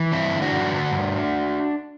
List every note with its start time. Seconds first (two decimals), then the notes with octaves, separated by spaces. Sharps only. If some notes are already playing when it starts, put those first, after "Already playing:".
Already playing: E3
0.12 G2 C4 E4
0.32 D3
0.42 D4 F#4
0.51 G2
0.71 D3
0.91 G2